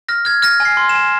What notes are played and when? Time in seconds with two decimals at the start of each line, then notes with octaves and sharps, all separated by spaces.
0.09 F6 A#6
0.25 F6 G#6
0.42 F6 A#6
0.60 G#5
0.65 C7
0.77 C6
0.89 E7
0.95 G#5